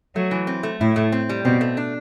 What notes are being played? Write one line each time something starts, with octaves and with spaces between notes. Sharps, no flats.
F#3 A3
E3
C4
A3
A2 E4
A3
C4
G3
B2 C4
A3
D4